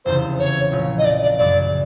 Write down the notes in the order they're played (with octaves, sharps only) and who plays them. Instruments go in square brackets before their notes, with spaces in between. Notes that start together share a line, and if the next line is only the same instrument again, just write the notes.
[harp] F1 E2 C#3 [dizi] C5
[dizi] C#5
[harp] A#1 A#2 F3 A3
[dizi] D#5
D5
D5
[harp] F#2 C#3 F#3 [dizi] D5